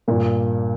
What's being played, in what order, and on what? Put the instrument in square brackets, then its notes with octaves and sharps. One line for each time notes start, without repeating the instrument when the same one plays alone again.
[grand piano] G2 [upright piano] A#2 A#3